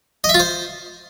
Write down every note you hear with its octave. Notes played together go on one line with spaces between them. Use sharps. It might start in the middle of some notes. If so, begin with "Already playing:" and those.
D#5
E5
F4
C5